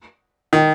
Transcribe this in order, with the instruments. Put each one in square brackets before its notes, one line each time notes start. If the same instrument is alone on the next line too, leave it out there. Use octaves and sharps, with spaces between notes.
[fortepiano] D#3